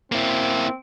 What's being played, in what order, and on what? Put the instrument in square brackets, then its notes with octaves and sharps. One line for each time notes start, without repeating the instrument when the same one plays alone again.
[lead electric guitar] A#3 E4 [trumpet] C4